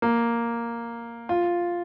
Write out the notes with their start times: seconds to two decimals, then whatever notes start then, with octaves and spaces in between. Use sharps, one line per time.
0.02 A#3
1.29 F4